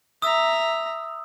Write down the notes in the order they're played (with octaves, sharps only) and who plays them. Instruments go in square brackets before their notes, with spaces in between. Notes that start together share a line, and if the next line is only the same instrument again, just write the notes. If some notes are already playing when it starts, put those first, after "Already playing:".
[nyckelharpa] E5 A#5 [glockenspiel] D#6 E6